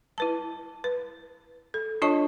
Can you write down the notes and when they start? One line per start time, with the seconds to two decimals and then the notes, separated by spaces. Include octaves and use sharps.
0.18 E4 B4 A5
0.84 B4
1.74 A4
2.02 D4 F4 C#5 D#5 A5 C#6